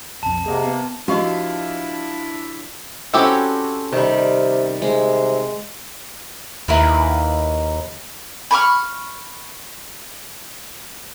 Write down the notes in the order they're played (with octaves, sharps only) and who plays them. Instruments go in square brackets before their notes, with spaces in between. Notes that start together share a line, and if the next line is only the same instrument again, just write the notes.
[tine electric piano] B1 F2 [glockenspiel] A5
[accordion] C3 A#3 [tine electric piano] G#4 D#5 F#5
[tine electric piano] B3
[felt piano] F3 [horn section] D4 E4 [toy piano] F#4 G4 D#5 [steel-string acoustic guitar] F5
[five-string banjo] C4 E4 G4 [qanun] C#4 F#4 A4
[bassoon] C3 [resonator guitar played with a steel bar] D#3 G3
[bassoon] C3 [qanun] G#3
[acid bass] D#2 [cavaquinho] E4 A#4 B4
[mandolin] B5 C#6 D6 F6